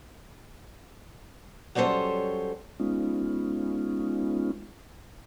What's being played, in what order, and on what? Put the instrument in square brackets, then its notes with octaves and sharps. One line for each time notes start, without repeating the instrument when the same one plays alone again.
[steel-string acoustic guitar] F#3 G3 C#4 A4 C5 C#5
[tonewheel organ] G#3 B3 C#4 D#4 F4